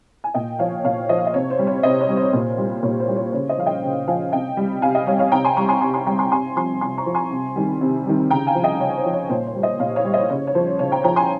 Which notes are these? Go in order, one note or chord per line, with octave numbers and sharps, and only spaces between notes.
G#5
A#2 D#5 G5
F3 C#5 F5
A#2 C#5 F5
F3 C5 D#5
F5
D#5
C3 C#5
C5
G3
C#5
C3 C5 D#5
C#5
G3
C5
A#2
G3
A#2 C#5
C5
G3
C#5
C#3 C#5
C5 D#5
F3 F5
D#5 G5
C#3
F3 F5 G#5
C3 D#5 G5
G3
C3 F5 G#5
D#5 G5
G3 C#5 F5
C#5 F5
C3 G5 A#5
G#5 C6
G3 A#5 C#6
G#5 C6
C3 G#5 C6
G#5 C6
G3 G5 A#5
G#5 C6
C3 G#5 C6
F3 G#5 C6
C3 G#5 C6
A#5 C#6
F3
G#5 C6
C3
D#3 G3
C3
D#3 G3
C#3 G5 A#5
F5 G#5
F3
D#5 G5
C#3 C#5
C5
F3
C#5
A#2 C5
C#5
G3
C5 D#5
A#2 C#5 F5
C#5 F5
G3
C5 D#5
C#3 C#5
C#5
F3 C5
C#3 C#5
G5 A#5
F3 G5 A#5
G#5 C6